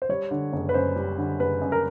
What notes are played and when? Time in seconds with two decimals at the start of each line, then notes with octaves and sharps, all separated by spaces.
0.02 C5
0.09 G3 C#5
0.31 D3
0.53 F#1
0.69 B4
0.74 F#2 C5
0.96 G3
1.18 D3
1.40 F#1 B4
1.61 F#2
1.72 A#4